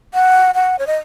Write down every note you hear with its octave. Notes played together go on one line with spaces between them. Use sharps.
F#5
F#5
C#5
D#5